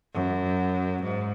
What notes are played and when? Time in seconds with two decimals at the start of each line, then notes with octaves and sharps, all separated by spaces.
0.14 F#2
1.03 G#2